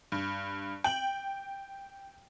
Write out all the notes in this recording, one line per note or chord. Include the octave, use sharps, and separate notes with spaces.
G2
G5 F#7